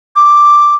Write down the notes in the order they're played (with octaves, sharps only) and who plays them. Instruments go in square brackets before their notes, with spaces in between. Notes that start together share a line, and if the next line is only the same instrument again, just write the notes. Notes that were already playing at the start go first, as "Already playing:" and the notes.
[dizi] D6